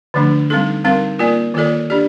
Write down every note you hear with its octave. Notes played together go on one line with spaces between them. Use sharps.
D3 F3 A3 D4
G3 C4 D#4 A4
G3 C4 D#4 A#4 F5
A#3 F4 A#4 D5
D#3 A#3 F4 A4 D5
D4 G4 D5